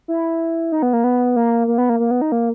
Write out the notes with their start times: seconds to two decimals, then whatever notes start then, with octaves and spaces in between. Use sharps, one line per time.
0.08 E4
0.72 D#4
0.82 B3
0.93 A#3
1.04 B3
1.36 A#3
1.67 A#3
1.78 B3
1.89 A#3
2.00 A#3
2.11 B3
2.21 D#4
2.32 A#3